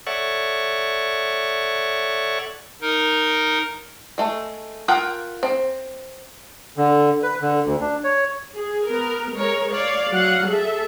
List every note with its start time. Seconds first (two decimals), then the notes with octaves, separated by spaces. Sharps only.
0.07 A4 C#5 D5 E5 F#5 C#6
2.81 D#4 A#4
4.18 G#3 A3
4.88 F4 A#4 F#5 G5
5.43 C4
6.77 D3
7.23 B4
7.41 D3
7.66 D2
7.80 D4
8.04 C#5
8.55 G#4
8.84 B3 A#4
9.33 G#3 A#4 C#5
9.70 C#5 D5 F5
10.09 F#3 F5 F#5
10.46 G#4 A4 E5